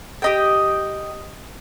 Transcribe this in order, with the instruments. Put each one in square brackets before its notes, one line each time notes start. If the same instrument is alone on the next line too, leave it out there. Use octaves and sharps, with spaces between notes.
[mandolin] G4 D#5 G5